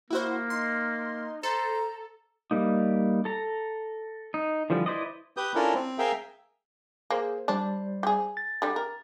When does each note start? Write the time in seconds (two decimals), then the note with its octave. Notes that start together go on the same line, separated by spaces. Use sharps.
0.10 A#3 E4 F#4 C5
0.50 D#4 C6
1.43 A4 C5 A#5
2.51 G3 A#3 D#4
3.25 A4 A#5
4.34 D#4
4.70 D3 E3 F3 G3
4.86 E4 B4 C5 D5 D#5
5.37 G4 B4 D#6 G6
5.55 C#4 D4 E4 F4 A4 A#4
5.74 C4
5.98 G#4 A#4 E5 F5 G5
7.10 A#3 G#4 C5
7.48 G3 D4 C5 D5
8.03 G4 G#4
8.37 A6
8.62 D3 G3
8.76 A#4